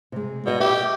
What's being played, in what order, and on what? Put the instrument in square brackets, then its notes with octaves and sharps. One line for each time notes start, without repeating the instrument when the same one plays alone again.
[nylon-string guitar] C3 G#3
[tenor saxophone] B2 [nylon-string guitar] D5 D#5
[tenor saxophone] G4 [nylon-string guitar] E5